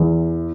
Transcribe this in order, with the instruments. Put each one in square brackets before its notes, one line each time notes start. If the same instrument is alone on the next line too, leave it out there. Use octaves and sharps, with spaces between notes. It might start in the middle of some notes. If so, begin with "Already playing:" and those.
Already playing: [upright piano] E2